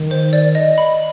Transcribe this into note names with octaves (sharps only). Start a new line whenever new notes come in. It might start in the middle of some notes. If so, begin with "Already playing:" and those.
Already playing: D#3
C5
D5
D#5
B5